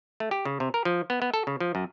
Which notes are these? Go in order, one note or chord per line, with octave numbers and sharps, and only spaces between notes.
A3
G4
C#3
C3
A#4
F3
B3
B3
A4
C#3
F3
F#2